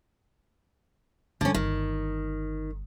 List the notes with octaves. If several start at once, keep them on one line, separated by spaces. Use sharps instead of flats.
B2 D3 G3 C#4
G1 D#3 G3